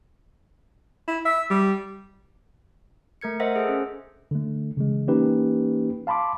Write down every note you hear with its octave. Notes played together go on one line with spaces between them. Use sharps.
E4
E5
G3
A3 A#4 G#6 C#7
A#4 C5 D#5 E5 F#5
G#4 A4 C5
C#4
D3 A3
C#3 E3 G#3
E3 A#3 C#4 D#4 G4 B4
F5 A5 B5 C6 D6